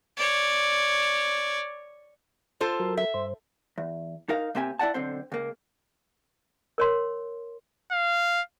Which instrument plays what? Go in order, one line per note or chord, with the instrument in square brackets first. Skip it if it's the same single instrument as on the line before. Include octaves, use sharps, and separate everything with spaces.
[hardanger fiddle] C#5 D5
[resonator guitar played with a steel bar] F4 A4 C5
[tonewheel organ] F#3 A#4
[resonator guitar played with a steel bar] E5
[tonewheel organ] G2 C5
[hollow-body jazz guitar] E2
D#4 A#4 F5
C3 A#3 C4 G4 G5 G#5
E4 D5 F#5 A5
B1 D3 C4 C5
C#2 A#3
[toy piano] A#4 C#5 C6
[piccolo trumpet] F5